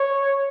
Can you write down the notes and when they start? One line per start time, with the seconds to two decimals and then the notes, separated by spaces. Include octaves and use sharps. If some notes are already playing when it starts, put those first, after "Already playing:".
Already playing: C#5